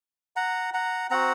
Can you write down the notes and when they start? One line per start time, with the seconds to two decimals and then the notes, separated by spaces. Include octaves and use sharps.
0.36 F#5 A#5
0.74 F#5 A#5
1.10 C4 F#4 F#5 A#5